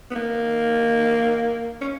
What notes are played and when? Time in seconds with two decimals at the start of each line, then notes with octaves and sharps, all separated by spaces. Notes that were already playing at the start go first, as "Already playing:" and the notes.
0.11 B3
0.15 A#3
1.81 C#4